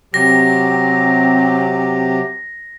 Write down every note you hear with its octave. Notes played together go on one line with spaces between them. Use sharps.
C3 F#3 C4 G4 A#6